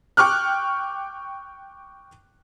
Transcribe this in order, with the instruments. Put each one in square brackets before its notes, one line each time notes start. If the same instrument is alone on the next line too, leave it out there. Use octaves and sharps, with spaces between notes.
[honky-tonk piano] G5 C#6 D6 F6 F#6